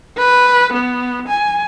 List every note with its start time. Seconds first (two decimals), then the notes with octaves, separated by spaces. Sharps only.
0.18 B4
0.73 B3
1.28 G#5